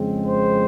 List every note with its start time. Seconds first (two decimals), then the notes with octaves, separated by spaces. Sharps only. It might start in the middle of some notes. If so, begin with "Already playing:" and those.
Already playing: F2 C#3 G#3 C4
0.26 C5